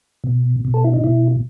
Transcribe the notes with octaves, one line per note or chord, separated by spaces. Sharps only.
B2
B2
A4
E4
D#4
B2 E4